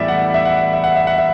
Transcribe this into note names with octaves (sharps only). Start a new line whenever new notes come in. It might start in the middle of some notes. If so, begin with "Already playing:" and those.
Already playing: A2 E3 G3 B3 D5 E5
F#5
E5
F#5
E5
F#5
E5
F#5
E5